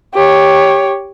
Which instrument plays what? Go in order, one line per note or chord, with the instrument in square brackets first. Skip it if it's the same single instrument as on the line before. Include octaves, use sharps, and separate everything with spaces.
[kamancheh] G4 C#5